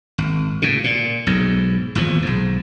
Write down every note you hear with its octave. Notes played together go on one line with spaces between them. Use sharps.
G#1
A2 C#3
A#2
B1 G#2
G#1 E2 A#2 F3
B1 G#2